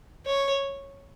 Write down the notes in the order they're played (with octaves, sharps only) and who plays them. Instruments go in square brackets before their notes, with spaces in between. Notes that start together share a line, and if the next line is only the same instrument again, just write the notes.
[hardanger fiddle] C#5